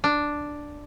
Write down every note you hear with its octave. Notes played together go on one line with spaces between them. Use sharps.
D4